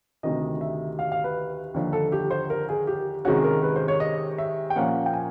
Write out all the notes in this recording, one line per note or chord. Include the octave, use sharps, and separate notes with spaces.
D2 C3 D#3 D#5
E5
F5
F5
B4
D#2 D3 F3
A4
G4
C5
A#4
G#4
G4
C3 D#3 G#3 C#4 F#4
A#4
B4
C5
C#5
D#5
E5
G5
A#2 F3 A#3 C#4 F#5
G5
G#5